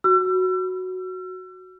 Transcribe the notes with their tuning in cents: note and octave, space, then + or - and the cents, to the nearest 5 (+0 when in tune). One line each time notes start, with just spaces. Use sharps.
F#4 +0 E6 +40